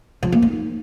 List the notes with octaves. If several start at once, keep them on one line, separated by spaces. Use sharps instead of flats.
F3
A#3
D#4